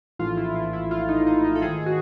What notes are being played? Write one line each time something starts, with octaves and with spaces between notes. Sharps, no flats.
A#1 A2 E3 A3 F4
E4
F4
E4
F4
D#4
D#4
D#4
A4
G#2 D#3 G#3 G#4
F#4